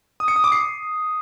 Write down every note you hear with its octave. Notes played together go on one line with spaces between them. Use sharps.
D#6
C#7
D#6
D6
C7